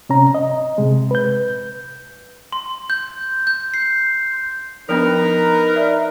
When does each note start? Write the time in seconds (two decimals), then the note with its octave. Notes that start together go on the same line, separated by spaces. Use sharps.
0.09 C3 C#4 A#5
0.35 D#5
0.78 C3 G#3
1.11 B4 G6
2.53 C6
2.90 G6
3.47 G6
3.74 C7
4.89 F3 B3 D4 D#4 A#4 B4
5.76 D5 E5